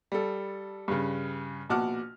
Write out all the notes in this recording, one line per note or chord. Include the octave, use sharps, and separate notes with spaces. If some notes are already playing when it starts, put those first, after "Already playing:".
G3 A4
G2 C#3
A#1 B2 F#4 A5 D6 F6